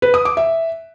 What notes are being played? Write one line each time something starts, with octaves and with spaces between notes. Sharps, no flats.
B4
D#6
D6
E5